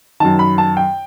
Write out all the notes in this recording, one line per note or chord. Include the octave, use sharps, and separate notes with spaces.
F#2 D#3 A5
B5
A5
G5